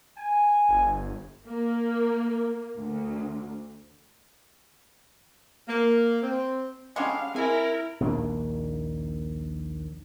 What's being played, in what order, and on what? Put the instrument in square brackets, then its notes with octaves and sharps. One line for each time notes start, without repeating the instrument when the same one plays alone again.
[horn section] G#5
[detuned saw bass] G1
[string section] A#3
D2
[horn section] A#3
C4
[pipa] D3 G3 G#3 [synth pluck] C#4 C6 C#6 [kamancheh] F5
[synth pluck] C4 G#4 G#5 [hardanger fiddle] E4 [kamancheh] A#4
[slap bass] A#1 D#2 A#3 D4